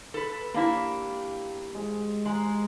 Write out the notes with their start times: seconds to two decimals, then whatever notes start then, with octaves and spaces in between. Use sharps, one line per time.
0.14 A4 B4
0.54 A#3 D4 E4 G4 F5
1.75 G#3
2.25 G#3 D#5 G#5 A#5